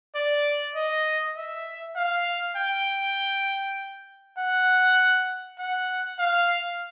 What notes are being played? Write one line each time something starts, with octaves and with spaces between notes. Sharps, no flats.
D5
D#5
E5
F5
G5
F#5
F#5
F5